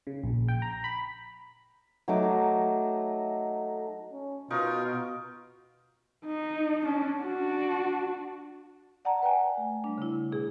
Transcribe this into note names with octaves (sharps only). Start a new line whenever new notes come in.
C#3
A#1
G5
A#5
B5
F#3 A3 D#4 D6
C#4
B2 D#4 F4 A#4 C#6
D#4
C#4 D4
D4 F#4
D5 F#5 A5 A#5
B4 G5 G#5
A3
G3 D4
C#3 E4
B2 G#4